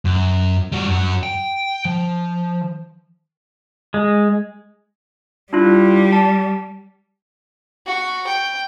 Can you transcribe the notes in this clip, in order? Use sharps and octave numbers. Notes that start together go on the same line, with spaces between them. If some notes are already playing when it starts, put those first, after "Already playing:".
F#2
G3 F#4
F#2 F#4
G5
F3
G#3
G3 D4 E4 F4
A5
F#4
G5